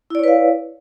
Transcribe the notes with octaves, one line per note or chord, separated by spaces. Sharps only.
E4 B4 C#5 D5 F5